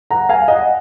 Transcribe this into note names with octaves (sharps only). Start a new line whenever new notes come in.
F#5 A#5
F5 G#5
D#5 F#5